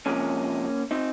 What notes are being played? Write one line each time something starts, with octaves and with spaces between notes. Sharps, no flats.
C3 F3 G#3 A#3 C#4
C4 D#4